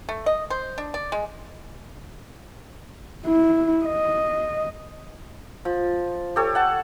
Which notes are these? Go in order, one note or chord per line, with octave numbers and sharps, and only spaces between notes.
A3
D#5
C5
D4
D5
G#3
E4
D#5
F3
G4 A4 C#5
F#5 A5